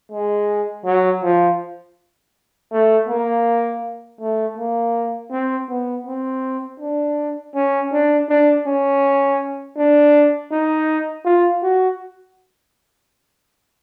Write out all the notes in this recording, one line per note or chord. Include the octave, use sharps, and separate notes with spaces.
G#3
F#3
F3
A3
A#3
A3
A#3
C4
B3
C4
D4
C#4
D4
D4
C#4
D4
D#4
F4
F#4